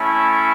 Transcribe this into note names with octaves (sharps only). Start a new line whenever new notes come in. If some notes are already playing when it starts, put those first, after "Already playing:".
Already playing: A3 C#4 E4